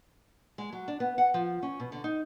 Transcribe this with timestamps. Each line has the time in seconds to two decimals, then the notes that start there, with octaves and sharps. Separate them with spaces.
0.58 G#3
0.73 F#3
0.88 D4
1.00 B3
1.18 F#5
1.34 F3
1.63 C#4
1.80 B2
1.92 D3
2.04 D#4